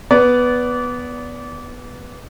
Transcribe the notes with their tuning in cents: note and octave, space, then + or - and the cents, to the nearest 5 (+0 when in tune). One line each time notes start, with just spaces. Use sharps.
B3 +0 D5 -25